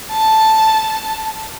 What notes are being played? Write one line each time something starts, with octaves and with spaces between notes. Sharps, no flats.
A5